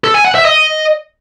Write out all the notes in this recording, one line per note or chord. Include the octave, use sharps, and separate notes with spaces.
A4
G#5
F#5
E5
D#5